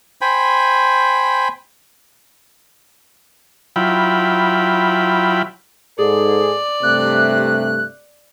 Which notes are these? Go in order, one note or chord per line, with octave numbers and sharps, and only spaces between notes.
C5 G5 G#5 B5
F#3 E4 F4 G5 B5
G#2 G#4 A4 D5
G2 C3 A3 F#6